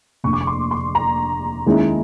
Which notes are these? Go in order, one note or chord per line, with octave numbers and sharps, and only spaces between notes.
F1 D#2 D3 C#6
D6
C#6
C6
C6
A#5
D#2 D#3 G#3 C#4 E4